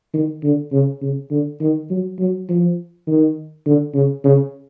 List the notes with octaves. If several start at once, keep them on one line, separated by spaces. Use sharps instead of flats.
D#3
D3
C#3
C#3
D3
D#3
F#3
F#3
F3
D#3
D3
C#3
C#3